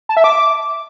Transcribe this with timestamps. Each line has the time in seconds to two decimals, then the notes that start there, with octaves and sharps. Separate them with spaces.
0.09 A5
0.17 E5
0.24 D6